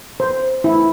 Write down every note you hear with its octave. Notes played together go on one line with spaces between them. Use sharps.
C5
E4